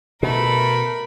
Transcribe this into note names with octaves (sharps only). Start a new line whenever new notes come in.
B2 A3 A#4 B5